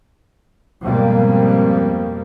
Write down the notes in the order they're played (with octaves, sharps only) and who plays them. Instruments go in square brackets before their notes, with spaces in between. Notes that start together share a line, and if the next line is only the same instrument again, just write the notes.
[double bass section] F2 G#2 B2 F3 G3 A#3